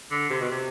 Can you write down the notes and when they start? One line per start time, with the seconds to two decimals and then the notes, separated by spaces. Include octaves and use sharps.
0.11 D3
0.30 C3
0.41 B2
0.52 C3